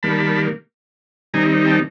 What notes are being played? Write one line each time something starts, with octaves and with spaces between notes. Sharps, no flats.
D#3 G3 A#3 A5 B5
D#3 G3 C4 D#4 G#5 A#5
G5 A5